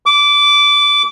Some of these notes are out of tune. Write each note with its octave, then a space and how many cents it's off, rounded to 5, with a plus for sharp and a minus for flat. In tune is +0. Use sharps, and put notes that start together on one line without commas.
D6 -15